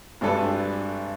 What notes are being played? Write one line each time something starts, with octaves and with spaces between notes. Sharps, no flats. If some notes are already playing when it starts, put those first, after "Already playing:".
G#1 G2 D4 A4 B4